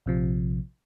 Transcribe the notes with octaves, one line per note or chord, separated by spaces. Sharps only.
A#1 C3 F3